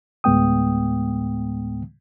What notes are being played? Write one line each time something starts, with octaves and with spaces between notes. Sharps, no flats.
D2 A2 G#3 B3 G5 D#6